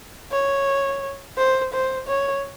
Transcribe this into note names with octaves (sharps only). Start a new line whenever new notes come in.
C#5
C5
C5
C#5